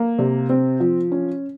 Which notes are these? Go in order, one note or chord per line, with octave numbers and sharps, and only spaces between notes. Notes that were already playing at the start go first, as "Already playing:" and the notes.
Already playing: A#3
C3
C4
F3
C#4